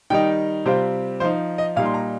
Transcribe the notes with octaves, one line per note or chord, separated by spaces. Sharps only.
D#3 G3 D#4 G5
C3 G3 C4 F4 C5
F3 D#4 C5
D#5
A#2 G3 D#4 F5
C6
A#5